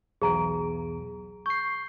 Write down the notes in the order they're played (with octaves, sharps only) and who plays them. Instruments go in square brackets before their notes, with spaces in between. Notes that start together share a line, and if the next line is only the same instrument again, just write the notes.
[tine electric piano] B1 E2 [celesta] G#4 A#5 D7
[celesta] C#6 [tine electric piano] G6 C7